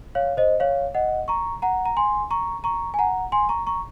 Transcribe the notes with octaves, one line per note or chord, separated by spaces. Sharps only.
C#5 F5
C5 D#5
C#5 F5
D#5 F#5
A#5 C#6
F#5 A#5
A#5
G#5 C6
A#5 C#6
A#5 C#6
G#5
F#5 A#5
G#5 C6
A#5 C#6
A#5 C#6